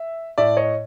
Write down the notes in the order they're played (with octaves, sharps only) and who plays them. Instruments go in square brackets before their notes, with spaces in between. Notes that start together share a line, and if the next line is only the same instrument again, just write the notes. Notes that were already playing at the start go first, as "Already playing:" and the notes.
Already playing: [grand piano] E5
A2 D5 E5
C#5 D#5